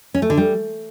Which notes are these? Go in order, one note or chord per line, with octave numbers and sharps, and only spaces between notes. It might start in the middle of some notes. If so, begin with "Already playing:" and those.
C#4
A3
D3
G3